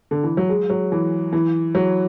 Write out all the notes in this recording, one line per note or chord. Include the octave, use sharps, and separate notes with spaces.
D3
E3
F#3
G#3
F#3
E3
E3
F#3